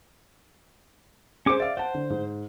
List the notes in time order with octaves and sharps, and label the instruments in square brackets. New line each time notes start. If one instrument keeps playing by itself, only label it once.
[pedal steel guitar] C#4 D6 [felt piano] G#4 C5
[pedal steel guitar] D5 [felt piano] E5 F5
[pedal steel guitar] C5 [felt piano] F#5 A5
[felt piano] D3
G#2